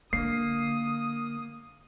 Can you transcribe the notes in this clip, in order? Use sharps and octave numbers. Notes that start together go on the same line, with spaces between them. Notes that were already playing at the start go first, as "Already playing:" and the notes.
D3 A#3 D#6 C7